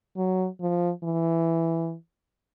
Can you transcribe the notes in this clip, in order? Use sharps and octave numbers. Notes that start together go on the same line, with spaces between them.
F#3
F3
E3